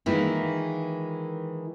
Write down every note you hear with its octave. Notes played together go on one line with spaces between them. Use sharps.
D#3 E3 G#3 A#3 E4 F4